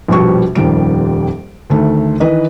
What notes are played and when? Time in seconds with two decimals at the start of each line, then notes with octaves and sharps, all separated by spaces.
0.08 A#1 F2 B2 G3 F#4 C#6
0.55 D#1 F2 D#3 G3 D7
1.70 D2 D#3 A3
2.20 D#3 E3 B4 D#5